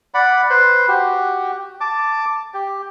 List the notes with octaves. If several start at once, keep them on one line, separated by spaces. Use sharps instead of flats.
D5 F#5 B5
B4 C5
F#4 G4
A5 D6
G4